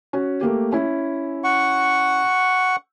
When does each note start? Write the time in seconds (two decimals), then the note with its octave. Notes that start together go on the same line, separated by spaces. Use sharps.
0.13 C#4 F#4
0.41 A3 A#3 G4
0.72 C#4 E4
1.44 F#5 C#6